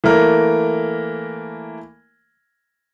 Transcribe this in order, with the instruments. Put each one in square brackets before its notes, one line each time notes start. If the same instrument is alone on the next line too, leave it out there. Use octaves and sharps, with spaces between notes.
[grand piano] E3 A3 A#3 A#4